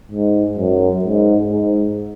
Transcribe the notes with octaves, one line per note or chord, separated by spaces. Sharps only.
G#2
F#2
G#2
G#2